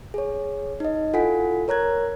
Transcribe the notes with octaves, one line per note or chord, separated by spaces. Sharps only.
G#4 C#5
D#4 D#5
E4 F4 A4 F#5 G#5 B6
A#4 C#5 A#5 F#6 G#6